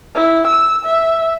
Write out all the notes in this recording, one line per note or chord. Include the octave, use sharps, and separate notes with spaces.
E4
E6
E5